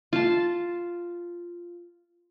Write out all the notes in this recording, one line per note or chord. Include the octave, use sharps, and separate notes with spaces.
F4 A5